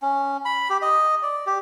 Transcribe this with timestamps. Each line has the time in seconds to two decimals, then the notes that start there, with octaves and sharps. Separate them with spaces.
0.02 C#4
0.45 B5
0.70 G4
0.82 D#5
1.23 D5
1.46 G4